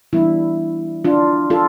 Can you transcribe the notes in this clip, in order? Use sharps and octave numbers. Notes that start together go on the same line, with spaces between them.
E3 G3 B3 D4 E4
D4 F4
F4 A4